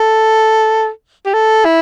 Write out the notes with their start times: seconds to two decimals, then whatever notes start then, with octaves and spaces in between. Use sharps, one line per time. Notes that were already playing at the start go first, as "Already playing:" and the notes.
Already playing: A4
1.25 G4
1.34 A4
1.65 E4